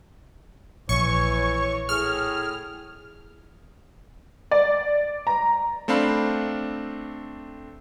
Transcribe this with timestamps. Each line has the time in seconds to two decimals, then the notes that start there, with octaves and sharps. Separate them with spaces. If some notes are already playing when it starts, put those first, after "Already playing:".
0.89 A#1 E3 C#5 C#6
1.89 A2 G#4 F6
4.51 D5
5.27 A#5
5.88 A3 C4 D4 F5 B5